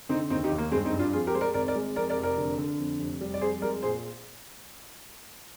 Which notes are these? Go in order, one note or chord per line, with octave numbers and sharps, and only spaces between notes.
D3 C4 D#4
D#2 C4 D#4
D#4 G4
D#2
A#3
G2 G#3 C4
C4 D#4
G2
D4 F4
F2 F4 G#4
G4 A#4
G#3 C5
A#4 D5
G#1 A#4 D5
A#4 D5
G#3
F2 A#4 D5
A#4 D5
F1
A#4 D5
D3
D3
F2
F1
G3
D5
F2 G#4 C5
G#3 A#4 D5
A#2 G#4 C5